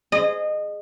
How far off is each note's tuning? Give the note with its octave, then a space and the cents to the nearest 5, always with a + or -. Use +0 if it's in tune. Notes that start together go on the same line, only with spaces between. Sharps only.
G#4 +0 D#5 -25